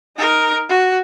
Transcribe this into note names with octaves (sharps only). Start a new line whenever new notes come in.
D#4 A#4
F#4